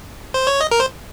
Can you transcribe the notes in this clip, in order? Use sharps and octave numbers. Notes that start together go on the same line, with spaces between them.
C5
C#5
D#5
A#4
C5